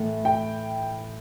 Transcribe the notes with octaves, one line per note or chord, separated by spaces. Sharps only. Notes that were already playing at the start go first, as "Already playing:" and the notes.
Already playing: A2 E3 A3 E4 A4
G5